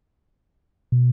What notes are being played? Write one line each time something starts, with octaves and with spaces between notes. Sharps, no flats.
B2